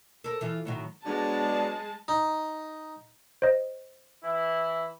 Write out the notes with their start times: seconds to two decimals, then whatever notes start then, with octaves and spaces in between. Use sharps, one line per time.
0.24 A4 A#4
0.41 E3 F4
0.65 A2 D#3 F#3
1.06 F#3 G#3 B3 D4 A5
2.08 D#4
3.42 C5 D#5
4.24 E3 E4